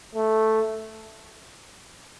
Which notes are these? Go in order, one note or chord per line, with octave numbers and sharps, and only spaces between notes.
A3